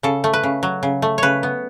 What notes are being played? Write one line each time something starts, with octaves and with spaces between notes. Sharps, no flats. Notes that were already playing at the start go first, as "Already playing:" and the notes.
C#3 A4
A3
B4
C#3
F#3
C#3
A3
C#3 B4 C#5
B3